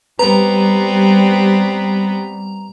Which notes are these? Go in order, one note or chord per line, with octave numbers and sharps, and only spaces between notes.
G3 B3 C4 B4 A#5